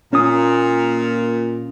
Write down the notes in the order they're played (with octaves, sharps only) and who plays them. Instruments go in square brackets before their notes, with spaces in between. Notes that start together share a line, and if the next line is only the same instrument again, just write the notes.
[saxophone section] A#2 [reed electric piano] C#4 D#6